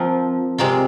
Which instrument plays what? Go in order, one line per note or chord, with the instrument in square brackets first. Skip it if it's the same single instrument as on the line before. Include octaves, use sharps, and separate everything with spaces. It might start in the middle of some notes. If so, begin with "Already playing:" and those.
Already playing: [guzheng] F3 C4 F4 A#4
C3 G#3 C4 F4 A#4